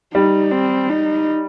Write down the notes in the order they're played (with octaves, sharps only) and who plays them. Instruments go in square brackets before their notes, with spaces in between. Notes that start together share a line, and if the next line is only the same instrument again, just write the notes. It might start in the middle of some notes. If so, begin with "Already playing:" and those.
[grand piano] G3 [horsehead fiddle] D#4
[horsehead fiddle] C4
D#4